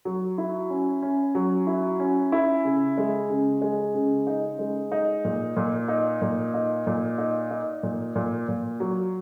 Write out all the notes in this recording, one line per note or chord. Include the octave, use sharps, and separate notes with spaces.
F#3
E4
C#4
C#4
F#3
E4
C#4
E4
C#3
G#3
C#3
G#3
C#3
D#4
G#3
D#4
A#2
A#2
D#4
A#2
D#4
A#2
D#4
D#4
A#2
A#2
A#2
F#3